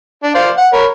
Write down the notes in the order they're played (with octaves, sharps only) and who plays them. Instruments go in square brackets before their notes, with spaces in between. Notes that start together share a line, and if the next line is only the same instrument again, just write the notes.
[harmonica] D4
C5 D5 F5
F#5
A#4 C#5 B5